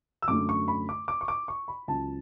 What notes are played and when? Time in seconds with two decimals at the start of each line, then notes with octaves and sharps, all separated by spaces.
0.22 E6
0.28 F#2 D3 A3 D6
0.49 C#6
0.68 B5
0.89 D6
1.08 D6
1.21 C#6
1.28 D6
1.48 C#6
1.68 B5
1.88 C#2 C#3 F#3 A5